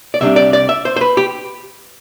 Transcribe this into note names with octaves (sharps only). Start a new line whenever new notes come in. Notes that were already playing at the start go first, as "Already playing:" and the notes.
D5
C2 C3 G3 D4 E5
D5
D5
E5
C5
C5
B4
G4